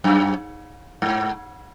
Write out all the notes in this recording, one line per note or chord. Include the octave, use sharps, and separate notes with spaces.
F#2
G#2